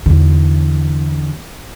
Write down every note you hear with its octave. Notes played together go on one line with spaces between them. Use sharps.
E2 D3